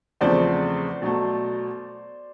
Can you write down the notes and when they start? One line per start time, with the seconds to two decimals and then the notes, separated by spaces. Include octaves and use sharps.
0.21 E2 C#3 F3 A3 C4 C5 D5
1.02 B2 F#3 A3